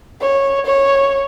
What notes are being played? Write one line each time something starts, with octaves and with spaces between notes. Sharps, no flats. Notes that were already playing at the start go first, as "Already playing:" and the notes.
C#5
C#5